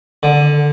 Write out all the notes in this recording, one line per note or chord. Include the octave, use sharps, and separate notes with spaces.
D3